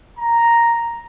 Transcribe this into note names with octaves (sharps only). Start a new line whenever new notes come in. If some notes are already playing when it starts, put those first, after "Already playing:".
A#5